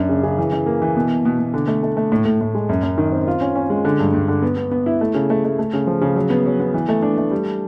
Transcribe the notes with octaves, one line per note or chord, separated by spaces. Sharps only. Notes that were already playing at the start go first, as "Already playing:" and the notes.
Already playing: F#2 D4
C#3
C#3
E3
E3
A#3
E3
B2
B2
B2
B2
D3
A3
A3
A3
A2
A2
A2
G#3
F#2
F#2
D#3
C4
F4
C#4
C#4
G#3
D3
G2
G2
D3
B3
B3
B3
E4
A3
C#3
A3
A3
A3
C#3
F3
C#3
F#3
B3
F#3
B3
E3
A3
D4
A3
G3